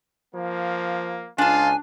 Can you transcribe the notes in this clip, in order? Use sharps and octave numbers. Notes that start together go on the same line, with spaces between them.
F3 A#3
C#2 D4 F4 G#5 A5